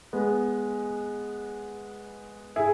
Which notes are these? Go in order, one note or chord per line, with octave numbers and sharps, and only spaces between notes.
G#3 B3
E4 G#4